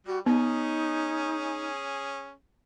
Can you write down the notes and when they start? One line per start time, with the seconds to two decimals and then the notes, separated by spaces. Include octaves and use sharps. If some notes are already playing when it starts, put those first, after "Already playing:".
0.07 G3 F#4
0.26 B3 C#4 D#4 G#4